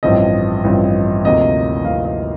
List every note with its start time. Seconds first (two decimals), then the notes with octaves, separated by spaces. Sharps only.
0.03 A1 G2 F3 C4 D#5
0.64 A1 G2 F3 C4
1.25 D2 C3 F3 A#3 D#4 D#5
1.85 D2 C3 F3 A#3 D#4 F5
2.05 D#5